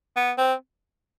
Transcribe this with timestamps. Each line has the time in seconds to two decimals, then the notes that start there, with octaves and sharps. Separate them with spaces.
0.16 B3
0.38 C4